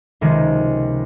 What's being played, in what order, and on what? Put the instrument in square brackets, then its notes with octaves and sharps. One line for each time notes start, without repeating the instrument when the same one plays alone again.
[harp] C#2 C3 D#3 F3 G#3